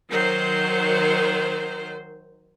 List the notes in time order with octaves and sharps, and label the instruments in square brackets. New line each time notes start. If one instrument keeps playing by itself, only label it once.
[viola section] D#3 F#3 C5